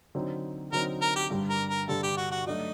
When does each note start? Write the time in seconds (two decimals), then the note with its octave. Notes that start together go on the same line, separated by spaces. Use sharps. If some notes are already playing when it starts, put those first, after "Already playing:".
0.15 D3 F#3 C4 D#4
0.73 D3 F#3 C4 D#4 A#4
1.02 A#4
1.16 G4
1.31 G2 D3 G3
1.50 A#4
1.69 A#4
1.88 G2 D3 G3 A4
2.03 G4
2.17 F#4
2.32 F#4
2.46 F#3 A3 D4 D#4 F#4